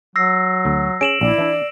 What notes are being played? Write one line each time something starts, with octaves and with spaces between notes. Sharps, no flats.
F#3 E6 A#6 C7
D2
C#4 G#4 D7 E7 F#7
A#1 E4 D5
E3 D4